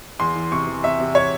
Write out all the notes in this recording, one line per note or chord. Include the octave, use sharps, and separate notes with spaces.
E2 C6
E3
C3 C#6
E3
C3 E5
C3
C#5